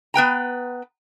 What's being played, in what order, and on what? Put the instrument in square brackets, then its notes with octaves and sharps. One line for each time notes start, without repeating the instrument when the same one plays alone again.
[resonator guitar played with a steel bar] B3 B4 G5 A#5